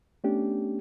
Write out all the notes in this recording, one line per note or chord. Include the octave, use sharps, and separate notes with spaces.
A3 B3 C#4 D4 G4